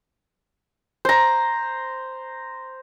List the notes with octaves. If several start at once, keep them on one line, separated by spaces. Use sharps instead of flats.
C5 A#5